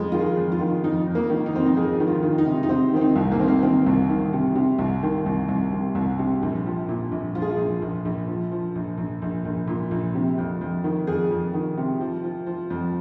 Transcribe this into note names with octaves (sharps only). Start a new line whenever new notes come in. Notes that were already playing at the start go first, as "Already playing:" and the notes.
Already playing: F2 G#3
D#3 F4
G#4
F2
F4
D#3
F2 D#4
F2
A#3
D#3
D#4
F2 C4
D#4
F2 G#4
D#3
F4
D#3
D#4
C3
D#4
C3 C4
D#3 C4
D#4
C2
A#3
D#3 C4
A#3
D#3 C4
C2
D#3
C3
C3
C2
D#3
C2
C2
C3
C2
C3
A#1
F3
A#2
A#1
F3 F4
G#4
F4
A#1
A#1
A#1
F3
F3
A#1
A#1
A#1
A#1
A#2
A#1
C3
F2
F2
D#3
F2 G#4
F2
D#3
C3
F3
F3
F3
F2